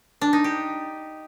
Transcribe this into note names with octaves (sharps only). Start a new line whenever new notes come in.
D4
D#4
G4